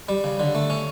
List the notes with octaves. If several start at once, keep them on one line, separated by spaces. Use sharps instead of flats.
G3
C#3
D3
A3
C#4